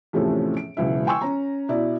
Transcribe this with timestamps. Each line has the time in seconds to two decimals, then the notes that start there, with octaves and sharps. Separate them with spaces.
0.13 E2 A2 C3 F3 A3 C#4
0.57 D7
0.77 E1 C#2 F#3 E4 E5
1.07 G5 G#5 C6 C#6 E6
1.22 C#4 A#5
1.69 B2 E4 D5